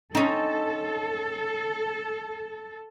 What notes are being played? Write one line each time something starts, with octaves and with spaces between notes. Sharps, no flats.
C4 C#4 D#4 A4